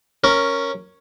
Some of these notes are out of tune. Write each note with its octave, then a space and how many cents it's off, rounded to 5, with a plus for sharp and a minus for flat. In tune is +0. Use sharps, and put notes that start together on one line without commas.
C#4 +0 A#4 +0